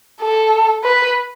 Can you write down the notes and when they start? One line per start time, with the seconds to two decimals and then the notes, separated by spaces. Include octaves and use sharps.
0.22 A4
0.84 B4